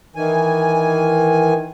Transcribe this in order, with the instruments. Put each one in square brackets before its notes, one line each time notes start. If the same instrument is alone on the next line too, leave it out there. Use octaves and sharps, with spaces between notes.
[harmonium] D#3 E3 G#5